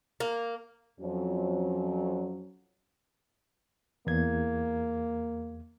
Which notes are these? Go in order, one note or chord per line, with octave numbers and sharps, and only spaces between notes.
A#3
F2 F#3 C#4
E2 A#3 G#6